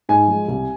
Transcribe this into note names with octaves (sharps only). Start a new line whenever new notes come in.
G#2 G#5
F3 G#3
C2